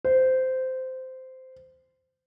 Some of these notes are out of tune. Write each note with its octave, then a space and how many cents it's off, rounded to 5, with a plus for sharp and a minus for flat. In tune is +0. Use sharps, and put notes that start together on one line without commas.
C5 -15